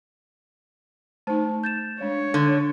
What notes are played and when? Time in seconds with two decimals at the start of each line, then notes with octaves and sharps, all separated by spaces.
1.27 A3 D#4 C5 A5
1.64 G6 A6 E7
2.01 G#3 D4 C#5
2.34 D3